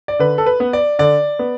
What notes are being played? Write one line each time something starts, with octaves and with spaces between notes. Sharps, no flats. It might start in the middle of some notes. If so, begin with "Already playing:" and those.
D5
D3 B4
A4
B4
B3
D5
D3 D5
B3